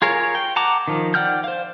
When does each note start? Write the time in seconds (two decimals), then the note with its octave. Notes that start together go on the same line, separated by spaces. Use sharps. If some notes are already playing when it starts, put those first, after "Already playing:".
0.02 F4 G#4 A#4 C#5
0.35 G5
0.56 F#5 A5 A#5 D6
0.88 D#3 F3
1.14 D5 F#5 G5 F6 G6
1.44 C5 F5